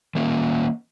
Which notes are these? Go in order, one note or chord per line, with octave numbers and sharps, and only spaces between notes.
D#3 A#3 C#4